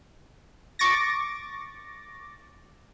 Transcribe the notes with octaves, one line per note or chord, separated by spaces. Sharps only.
C#6 D6 A6 A#6